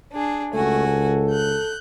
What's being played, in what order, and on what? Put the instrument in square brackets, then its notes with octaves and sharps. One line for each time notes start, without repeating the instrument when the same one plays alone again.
[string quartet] D4 G#4
[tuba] C#2 [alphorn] A3 [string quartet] F#4 G#5
[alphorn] A4
[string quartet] F#6 G6